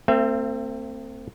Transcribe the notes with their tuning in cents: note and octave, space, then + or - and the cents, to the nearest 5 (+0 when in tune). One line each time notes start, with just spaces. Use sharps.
A3 +45 C4 -5 E5 +30